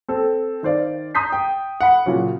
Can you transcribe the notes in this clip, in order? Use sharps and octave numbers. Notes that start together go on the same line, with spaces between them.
C4 A4
D#3 C5 D5 F5
A#5 C6 D#6 G6 B6 C7
G5
F#5 B5
A#2 C#3 F#3